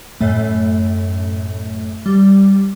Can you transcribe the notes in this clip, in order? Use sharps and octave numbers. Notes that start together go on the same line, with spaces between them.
F#2 A2 A3
G3